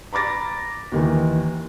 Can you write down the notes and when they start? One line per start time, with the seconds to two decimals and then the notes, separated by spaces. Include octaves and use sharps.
0.13 A#5 B5 D6 A6 A#6
0.92 D#2 D#3 E3